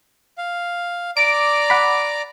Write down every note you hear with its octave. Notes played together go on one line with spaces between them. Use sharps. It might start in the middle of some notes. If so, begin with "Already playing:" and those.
F5
D5 A#5 D6 D7
F#5 B5